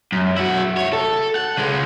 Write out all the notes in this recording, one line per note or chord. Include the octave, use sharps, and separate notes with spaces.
F#2
E4 F#4
C2 C#5
A4
F#5
C#3 G#3